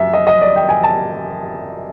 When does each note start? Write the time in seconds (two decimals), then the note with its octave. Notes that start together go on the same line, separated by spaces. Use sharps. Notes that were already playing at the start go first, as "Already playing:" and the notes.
Already playing: F#2 E5
0.13 D#5
0.27 D#5
0.42 D5
0.56 G5
0.69 G#5
0.83 A5